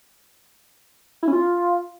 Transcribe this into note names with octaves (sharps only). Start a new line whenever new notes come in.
E4
C#4
F4